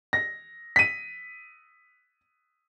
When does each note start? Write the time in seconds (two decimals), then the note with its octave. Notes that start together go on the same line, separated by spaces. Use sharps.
0.13 A#6
0.76 B6 D#7